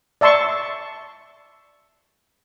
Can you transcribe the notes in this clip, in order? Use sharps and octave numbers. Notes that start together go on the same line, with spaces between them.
D5 E5 A5 C6 C#6